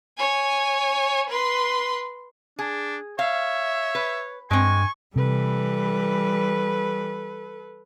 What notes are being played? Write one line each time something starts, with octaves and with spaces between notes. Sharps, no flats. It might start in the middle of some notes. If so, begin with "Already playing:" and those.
C#5 G#5
B4 C6
D4 G#4
C#5 E5 F5
B4
G2 G#3 C4 G#5 C#6
C3 E3 G3 A4 B4